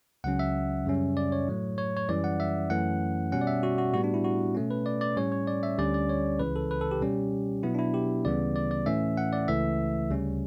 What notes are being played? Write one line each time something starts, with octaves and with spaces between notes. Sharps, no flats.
C#2 C#3 F#3 C#4 F#5
E5
F#2 C#3 G3 C#4
D5
C#5
A2 F#3 A3
C#5
C#5
F#2 E3 G3 C#4 D5
F#5
E5
F#2 E3 A3 C#4 F#5
B2 G3 C#4 F#5
D5
E5
F#4
F#4
A2 G3 B3 F#4
D4
E4
F#4
B2 A3 C#4
B4
D5
D5
A2 G3 C#4 C#5
C#5
D5
E5
D2 D3 G3 C#4 D5
D5
C#5
C#2 C#3 E3 B4
A4
B4
A4
G4
B2 G3 C#4
B2 F#3 B3 E4
D4
E4
G4
D2 C#3 E3 G3 B3 D5
D5
D5
A2 E3 A3 C#4 E5
F#5
D5
C#2 C#3 E3 A3 E5
D2 C#3 G3 C#4